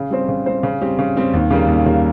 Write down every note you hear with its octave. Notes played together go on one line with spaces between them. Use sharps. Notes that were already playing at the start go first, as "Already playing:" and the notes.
Already playing: C#3
G3 C4 G4 C5
C#3
G3 C4 G4 C5
C#3
G3 C4 G4
C#3
G3 C4 G4
D#2
C#3 G3 A#3
D#2
C#3 G3 A#3